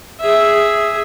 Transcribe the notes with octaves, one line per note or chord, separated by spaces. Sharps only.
G#4 E5